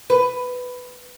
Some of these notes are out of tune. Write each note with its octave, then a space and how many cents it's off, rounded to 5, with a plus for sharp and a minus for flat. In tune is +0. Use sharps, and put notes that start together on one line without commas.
B4 +10